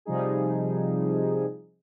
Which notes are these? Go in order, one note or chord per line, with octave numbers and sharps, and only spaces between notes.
C3 F3 G3 D#4 G#4